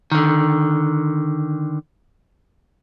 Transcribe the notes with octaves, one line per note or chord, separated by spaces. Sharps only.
D3 D#3